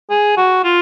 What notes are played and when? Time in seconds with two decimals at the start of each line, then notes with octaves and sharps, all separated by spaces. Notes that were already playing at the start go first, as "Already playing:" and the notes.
0.10 G#4
0.37 F#4
0.64 F4